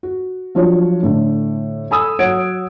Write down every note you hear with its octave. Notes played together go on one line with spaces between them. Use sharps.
F#4
F3 F#3 D4 F4 C#5
A2 D3
A4 G#5 B5 D#6 E6
F#3 C#5 F#5 G#6 D7